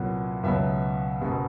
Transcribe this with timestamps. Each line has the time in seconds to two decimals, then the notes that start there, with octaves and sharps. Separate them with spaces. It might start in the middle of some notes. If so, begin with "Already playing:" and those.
Already playing: C2 A#2 F#3 B3
0.44 C#2 B2 F#3 B3 E5
1.22 F#1 B2